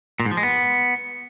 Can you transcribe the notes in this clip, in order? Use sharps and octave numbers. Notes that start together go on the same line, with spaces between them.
A#2
G#2
F3
G#3
B3